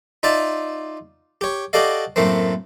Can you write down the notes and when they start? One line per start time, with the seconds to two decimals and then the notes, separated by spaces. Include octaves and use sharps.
0.23 D#4 F4 D5 E5 A5
1.41 G4 C#5
1.73 F#4 G4 A4 D5 D#5 F5
2.16 F#2 A2 A3 A#3 C4